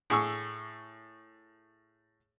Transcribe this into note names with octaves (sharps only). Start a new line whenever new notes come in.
A2 G#4 C#6 E6